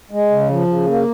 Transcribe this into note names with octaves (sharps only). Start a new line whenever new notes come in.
G#3
C#3
F3
C#3
A#3